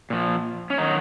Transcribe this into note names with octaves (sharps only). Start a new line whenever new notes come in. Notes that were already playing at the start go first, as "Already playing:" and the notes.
A#2 F3
C#4
D#3 F#3 D#4